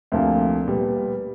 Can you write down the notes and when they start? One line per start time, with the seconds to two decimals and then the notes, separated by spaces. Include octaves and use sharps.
0.12 D2 C3 F3 A#3 D4
0.67 A#2 G3 B3